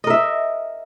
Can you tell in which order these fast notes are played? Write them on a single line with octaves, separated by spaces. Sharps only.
D#5 A#4 E5